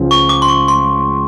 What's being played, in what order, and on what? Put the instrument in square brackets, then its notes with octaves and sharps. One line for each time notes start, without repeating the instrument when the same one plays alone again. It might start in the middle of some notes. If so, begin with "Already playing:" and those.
Already playing: [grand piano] C#2 C#3 F3
[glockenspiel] C#6
D6
C6
C#6
C6